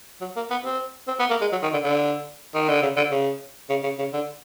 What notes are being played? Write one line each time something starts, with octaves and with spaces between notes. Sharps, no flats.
F#3
A#3
B3
C4
C4
B3
A#3
G#3
F#3
D#3
D3
D3
D#3
D3
C#3
D3
C#3
C#3
C#3
C#3
D3